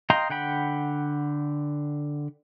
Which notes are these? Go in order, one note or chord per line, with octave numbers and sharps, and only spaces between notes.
D#5 F5 G5 A#5 C6
D3 F#5 G5 B5